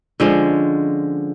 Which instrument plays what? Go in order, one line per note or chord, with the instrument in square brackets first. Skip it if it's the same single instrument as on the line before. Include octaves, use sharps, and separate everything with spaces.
[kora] D3 F3 G#3 C#4